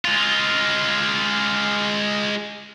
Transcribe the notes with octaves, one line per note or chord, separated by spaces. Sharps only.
G#3 F4